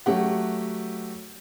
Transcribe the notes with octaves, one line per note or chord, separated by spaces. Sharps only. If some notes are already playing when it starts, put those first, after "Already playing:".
F#3 A3 G4 F#5